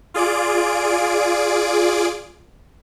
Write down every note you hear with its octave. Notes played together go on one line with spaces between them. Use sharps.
F4 G#4 D5 D7